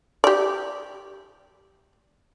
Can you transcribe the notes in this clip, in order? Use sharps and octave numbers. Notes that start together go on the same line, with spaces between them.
G4 D5